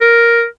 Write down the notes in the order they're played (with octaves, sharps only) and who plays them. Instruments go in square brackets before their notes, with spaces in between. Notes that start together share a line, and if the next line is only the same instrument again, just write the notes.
[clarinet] A#4